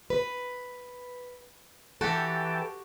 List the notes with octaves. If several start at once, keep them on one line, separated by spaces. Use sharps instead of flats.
B4
E3 F#4 G4 A4 G5 A5